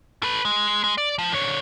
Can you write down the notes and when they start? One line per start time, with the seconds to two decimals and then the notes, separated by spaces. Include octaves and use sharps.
0.23 A4 B4
0.45 G#3
0.84 G#3
0.98 D5
1.19 F3
1.32 D3 C#5